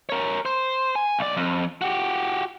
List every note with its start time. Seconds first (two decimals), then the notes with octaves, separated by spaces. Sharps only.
0.09 A#4 C#5
0.45 C5
0.95 G#5
1.19 B1 D5
1.37 F2
1.82 F#4 G4